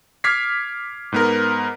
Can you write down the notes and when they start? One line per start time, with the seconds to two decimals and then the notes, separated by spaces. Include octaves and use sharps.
0.24 D6 F6 G#6 B6 C7
1.12 G#2 B3 A#4